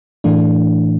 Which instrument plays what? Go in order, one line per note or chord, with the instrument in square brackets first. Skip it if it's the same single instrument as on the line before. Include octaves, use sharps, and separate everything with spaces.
[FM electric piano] A2 E3 A3 D4